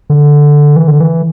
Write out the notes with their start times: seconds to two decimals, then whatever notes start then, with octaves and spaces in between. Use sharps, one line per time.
0.10 D3
0.76 E3
0.88 D3
1.00 E3